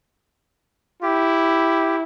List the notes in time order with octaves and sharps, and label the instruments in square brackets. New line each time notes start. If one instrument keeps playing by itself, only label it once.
[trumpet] E4 [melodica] G4